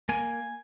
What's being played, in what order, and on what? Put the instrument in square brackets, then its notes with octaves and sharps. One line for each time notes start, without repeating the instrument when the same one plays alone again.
[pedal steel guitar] A#3 G#5